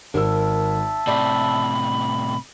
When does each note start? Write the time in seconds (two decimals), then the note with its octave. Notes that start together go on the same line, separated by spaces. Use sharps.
0.14 G#1 A#4 E5 A5 E6
1.07 A2 C3 D5 B5